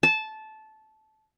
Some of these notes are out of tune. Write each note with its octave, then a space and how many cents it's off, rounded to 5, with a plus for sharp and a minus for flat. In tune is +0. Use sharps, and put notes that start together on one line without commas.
A5 -15